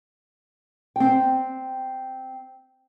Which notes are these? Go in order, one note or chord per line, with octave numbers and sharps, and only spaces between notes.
C4 G5